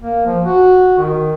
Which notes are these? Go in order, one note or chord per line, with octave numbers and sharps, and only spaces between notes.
A#3
F3
F#4
D#3